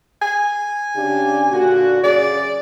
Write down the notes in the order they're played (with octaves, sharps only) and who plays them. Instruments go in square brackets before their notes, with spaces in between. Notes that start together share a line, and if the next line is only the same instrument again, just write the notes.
[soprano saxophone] G#5
[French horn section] C#3 D4 G4
A#2 D3 F#4
[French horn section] F#2 C#3 G#4 [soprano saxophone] D5